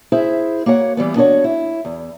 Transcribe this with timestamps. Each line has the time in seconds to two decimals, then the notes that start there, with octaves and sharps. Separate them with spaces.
0.12 E4 G#4 C5 E5
0.66 A#3 F#4 C#5 F#5
0.97 E3 G3 B3
1.16 B3 D4 F#4 A4 C#5 F#5
1.44 E4
1.85 E2